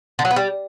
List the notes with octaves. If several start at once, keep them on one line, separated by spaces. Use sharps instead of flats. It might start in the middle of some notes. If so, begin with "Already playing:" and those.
D3
F#3
B3
G3